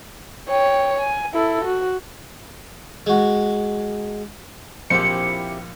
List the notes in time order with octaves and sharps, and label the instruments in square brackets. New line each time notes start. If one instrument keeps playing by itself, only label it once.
[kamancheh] C#5 G5
G#5
E4 A4
F#4
[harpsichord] G#3 F#4
[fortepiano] A#1 [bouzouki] C4 E4 G4 [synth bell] C#7